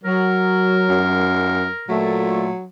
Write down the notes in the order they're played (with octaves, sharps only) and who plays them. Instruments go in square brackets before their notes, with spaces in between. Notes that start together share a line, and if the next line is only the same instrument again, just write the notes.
[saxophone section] F#3 [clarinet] A#4
[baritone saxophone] F#2
[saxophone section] A#2 A3 [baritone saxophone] F#3